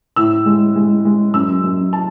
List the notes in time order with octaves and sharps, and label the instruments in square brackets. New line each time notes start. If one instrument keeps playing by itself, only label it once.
[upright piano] A2 E6
G#3
G#3
G#3
F#2 E6
F#2
A5